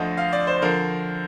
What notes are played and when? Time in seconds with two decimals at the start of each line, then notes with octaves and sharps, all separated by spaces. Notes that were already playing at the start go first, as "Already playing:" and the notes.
Already playing: D2 D3 F3 D#5
0.17 F5
0.33 D5
0.47 C5
0.62 D3 F3 A#4